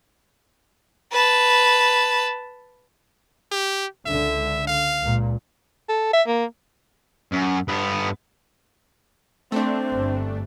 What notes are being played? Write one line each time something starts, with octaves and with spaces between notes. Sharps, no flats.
B4 A5
G4
C#2 D3 E5
F5
C#2 A#2
A4
E5
A#3
F#2
G2 B3
A3 C4 D4 C5
G1